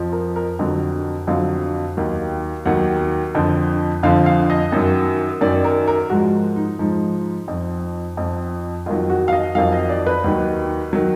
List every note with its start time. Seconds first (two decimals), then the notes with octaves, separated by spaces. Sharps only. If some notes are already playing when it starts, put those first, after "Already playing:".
Already playing: F2 F3
0.12 A#4
0.36 A#4
0.59 F2 D3 F#3
1.27 F2 D3 F#3 F5
1.97 D#2 D#3 F#3
2.66 D#2 D#3 F#3 F#5
3.35 F2 D3 F3
4.03 F2 D3 F3 F5
4.26 F5
4.50 D#5
4.72 F#2 D#3 F#3
5.41 F#2 D#3 F#3 D5
5.64 A#4
5.88 A#4
6.10 G#2 F3 F#4
6.56 D#4
6.79 G#2 F3 D#4
7.48 F2 F3
8.17 F2 F3
8.86 F2 D#3 F#3 F4
9.10 F#4
9.28 F5
9.33 D#5
9.55 F2 D#3 F#3 F5
9.72 D#5
9.89 D5
10.07 B4
10.24 D#2 D#3 F#3
10.93 D#3 F#3